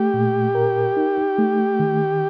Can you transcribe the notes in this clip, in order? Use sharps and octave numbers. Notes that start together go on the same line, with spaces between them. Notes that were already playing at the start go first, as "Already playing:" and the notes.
Already playing: A3 G4
A#2
A#4
D#4
A3
D#3